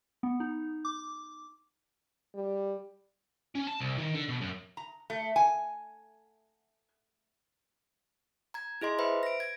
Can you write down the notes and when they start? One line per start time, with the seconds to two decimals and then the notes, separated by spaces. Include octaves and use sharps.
0.23 B3
0.40 D#4
0.85 D6
2.35 G3
3.55 C#4
3.67 A5
3.80 C2
3.98 D#3
4.15 D3
4.29 B2
4.41 F#2
4.77 A#5
5.10 A3
5.36 G#5
8.54 A#5 G#6
8.81 E4 G#4 D#5 C6
8.99 B4 C5 E5 B5
9.23 A#6 D7
9.40 G#6